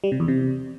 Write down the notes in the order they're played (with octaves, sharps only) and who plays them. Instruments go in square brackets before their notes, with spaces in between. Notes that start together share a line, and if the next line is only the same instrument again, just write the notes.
[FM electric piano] G3
C3
E2
C3